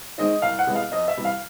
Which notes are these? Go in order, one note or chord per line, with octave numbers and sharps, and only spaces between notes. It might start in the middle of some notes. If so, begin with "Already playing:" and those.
D#3 G#3 C4 D#4 D#5
C2 F5
F#5
C3 E3 G#3 B3
F5
F2 D#5
E5
C3 E3 G3
F5